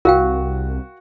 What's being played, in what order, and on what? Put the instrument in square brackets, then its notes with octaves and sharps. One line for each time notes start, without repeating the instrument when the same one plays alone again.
[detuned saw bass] C2 [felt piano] F#4 [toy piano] A#4 F5 G5